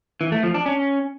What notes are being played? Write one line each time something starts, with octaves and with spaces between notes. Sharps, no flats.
E3
A3
F3
D4
C#4